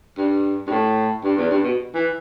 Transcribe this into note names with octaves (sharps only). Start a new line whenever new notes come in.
G2
G2
A2
G2
E2
G2
B2
E3